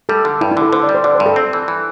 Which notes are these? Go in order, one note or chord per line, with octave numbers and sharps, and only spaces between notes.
G3 A4
D3
G2 E4
E4
D3
A4
D3 C5
D5
G3
C5
D3 D5
C5
G2
A4
C4
E3
E3